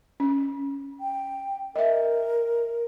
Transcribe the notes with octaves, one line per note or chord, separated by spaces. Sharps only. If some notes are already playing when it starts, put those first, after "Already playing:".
C#4
G5
A#4 D#5 E5